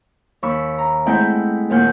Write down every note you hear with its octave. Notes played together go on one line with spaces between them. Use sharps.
D#2 B5 C#6 E6
A#5
G#3 A3 C4 E4 F#5 G5
D#2 A#2 A#3 F#5 G6